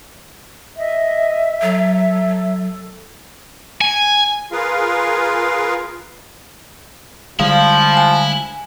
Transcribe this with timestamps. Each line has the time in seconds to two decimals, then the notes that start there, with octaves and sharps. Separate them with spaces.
0.77 D#5 E5
1.62 F#3 A4
3.81 G#5
4.52 F4 G#4 A#4 B4 F5
7.40 D3 F3 G3 G#3 E4 F5
7.97 G#5